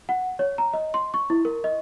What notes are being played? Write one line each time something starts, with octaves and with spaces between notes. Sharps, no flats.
F#5
C#5
A#5
D#5
C6
C#6
E4
A#4
D#5